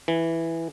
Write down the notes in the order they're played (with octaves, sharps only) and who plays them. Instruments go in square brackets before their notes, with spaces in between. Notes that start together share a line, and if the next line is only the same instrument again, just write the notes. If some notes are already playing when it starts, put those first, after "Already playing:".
[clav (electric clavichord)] E3